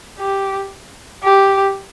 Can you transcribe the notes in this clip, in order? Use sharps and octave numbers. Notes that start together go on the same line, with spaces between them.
G4
G4